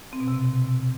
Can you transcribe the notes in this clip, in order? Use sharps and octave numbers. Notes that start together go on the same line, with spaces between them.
C4
B2
C3